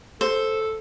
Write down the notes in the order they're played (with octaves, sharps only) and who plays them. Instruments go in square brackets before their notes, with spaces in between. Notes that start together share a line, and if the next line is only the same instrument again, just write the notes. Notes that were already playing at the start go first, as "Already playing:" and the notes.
[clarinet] A4 [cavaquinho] C5